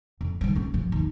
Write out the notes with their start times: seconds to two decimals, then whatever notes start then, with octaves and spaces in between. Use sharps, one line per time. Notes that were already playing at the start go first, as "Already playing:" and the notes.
0.21 F2
0.41 D#3 G3
0.55 C4 C#4
0.74 F#2 F3
0.92 D#2